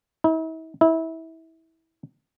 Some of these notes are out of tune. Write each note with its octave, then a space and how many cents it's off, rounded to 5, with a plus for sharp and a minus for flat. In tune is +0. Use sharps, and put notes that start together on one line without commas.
E4 -45
E4 -25